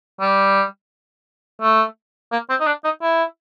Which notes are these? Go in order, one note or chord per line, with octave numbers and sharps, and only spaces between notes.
G3
A3
A#3
C4
D#4
D4
D#4
E4